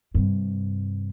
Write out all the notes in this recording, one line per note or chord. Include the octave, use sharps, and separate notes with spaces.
G2 C3